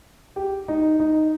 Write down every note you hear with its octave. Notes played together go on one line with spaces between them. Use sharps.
G4
D#4
D#4